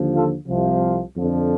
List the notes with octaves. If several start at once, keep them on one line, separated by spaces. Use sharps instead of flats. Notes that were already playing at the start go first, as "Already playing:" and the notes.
Already playing: D#2 D3 F3
F4 A4
C2 C3 F3
F2 D3 F3